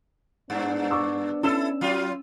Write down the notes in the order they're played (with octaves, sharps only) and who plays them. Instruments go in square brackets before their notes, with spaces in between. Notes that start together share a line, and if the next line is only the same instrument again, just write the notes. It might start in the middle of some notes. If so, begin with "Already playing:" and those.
[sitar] G2 [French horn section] B3 D4
[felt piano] C#6 D6 E6
[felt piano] C#4 E6 E7 [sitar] E4 A4
[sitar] F#3 F4